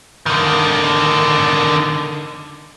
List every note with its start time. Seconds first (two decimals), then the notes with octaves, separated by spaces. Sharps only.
0.26 D3 D#3